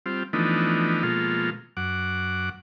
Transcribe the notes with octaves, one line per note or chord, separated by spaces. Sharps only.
G3 C4 F4
E3 F3 A3 B3 D4 D#4
B2 F3 G#3 A#3 F4 A4
F#2 F#5 D6